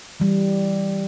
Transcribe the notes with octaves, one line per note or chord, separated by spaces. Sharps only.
E3 G3